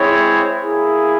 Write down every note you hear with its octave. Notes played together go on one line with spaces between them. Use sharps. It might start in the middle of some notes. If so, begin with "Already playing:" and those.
Already playing: G#3 C4 E4 G#4 C#5
A#3 E4 G#4